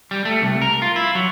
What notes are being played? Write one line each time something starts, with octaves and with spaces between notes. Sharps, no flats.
G3
A3
C2
A#4
F4
E4
F#3